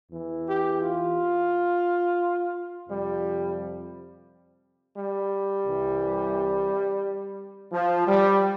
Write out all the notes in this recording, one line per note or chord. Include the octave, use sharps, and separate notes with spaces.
E2 E3
G4
F4
F2 C3 F3 G3
G3
C2 C3 E3
F3
G3